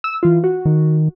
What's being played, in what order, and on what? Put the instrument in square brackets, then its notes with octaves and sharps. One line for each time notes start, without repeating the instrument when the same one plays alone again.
[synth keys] E6
E3 F4
F#4
[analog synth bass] D#3